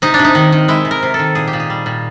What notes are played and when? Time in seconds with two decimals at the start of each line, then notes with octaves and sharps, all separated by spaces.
0.02 C3 D#4
0.14 D4
0.19 C3
0.25 D#4
0.35 D#3
0.52 D#3
0.68 G#3 E4
0.85 C3
0.91 A#4
1.03 C3
1.14 A4
1.19 D#3
1.35 A#2 G#4
1.48 G4
1.53 A#2
1.60 G#4
1.70 G3
1.86 A#2